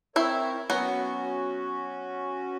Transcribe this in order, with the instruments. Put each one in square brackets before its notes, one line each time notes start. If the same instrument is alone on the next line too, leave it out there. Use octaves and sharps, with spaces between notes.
[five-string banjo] C4 E4 [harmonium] A#4 C#5 E5
[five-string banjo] F#3 B3 [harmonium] C#4 F#4